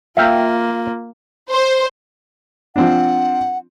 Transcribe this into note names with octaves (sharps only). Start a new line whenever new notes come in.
A#3 F4 E5 F5 G5
C5
F3 C4 D4 F#5